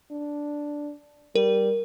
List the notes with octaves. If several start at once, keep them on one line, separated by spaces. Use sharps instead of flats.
D4
G3 A#4